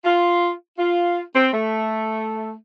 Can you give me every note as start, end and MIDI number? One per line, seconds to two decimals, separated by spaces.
0.04 0.50 65
0.78 1.20 65
1.35 1.48 60
1.53 2.53 57